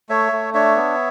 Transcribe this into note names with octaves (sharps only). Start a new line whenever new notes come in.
A3 C#5 E5
A3
D4 C#5 E5
B3